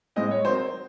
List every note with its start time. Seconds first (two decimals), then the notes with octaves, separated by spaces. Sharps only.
0.16 A2 G#3 C4 D#5
0.31 C#5
0.45 D#3 F#3 C4 C5